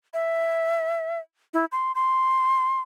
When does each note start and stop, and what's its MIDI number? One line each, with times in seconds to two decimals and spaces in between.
0.14 1.19 76
1.54 1.65 64
1.72 1.92 84
1.95 2.80 84